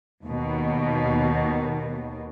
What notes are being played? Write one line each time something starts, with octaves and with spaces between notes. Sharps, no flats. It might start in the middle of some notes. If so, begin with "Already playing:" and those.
D#2 B2